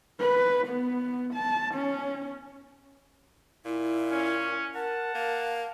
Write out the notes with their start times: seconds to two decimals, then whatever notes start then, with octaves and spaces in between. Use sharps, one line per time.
0.19 B4
0.67 B3
1.34 A5
1.75 C#4
3.65 A#2 E4
4.11 C#4
4.75 A#4 F#5 A5
5.15 A#3 F5